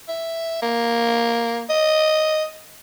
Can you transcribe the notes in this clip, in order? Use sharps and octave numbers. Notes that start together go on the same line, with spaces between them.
E5
A#3
D#5